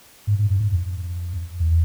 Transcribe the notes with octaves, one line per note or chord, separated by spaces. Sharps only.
G#2
G#2
G2
G#2
F2
E2